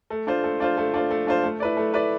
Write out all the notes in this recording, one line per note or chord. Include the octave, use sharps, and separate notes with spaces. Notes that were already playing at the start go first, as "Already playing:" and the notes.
A3
D4 F4 C5
A3
D4 F4 C5
A3
D4 F4 C5
A3
D4 F4 C5
A3
E4 B4 D5
A3
E4 B4 D5